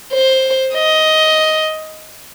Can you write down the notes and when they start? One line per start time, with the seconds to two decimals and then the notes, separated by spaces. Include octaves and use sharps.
0.12 C5
0.74 D#5